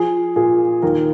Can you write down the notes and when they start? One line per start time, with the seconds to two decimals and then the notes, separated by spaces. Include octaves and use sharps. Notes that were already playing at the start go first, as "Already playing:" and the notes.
Already playing: F3 G#4
0.36 A#2 G#4
0.82 D#2 A#4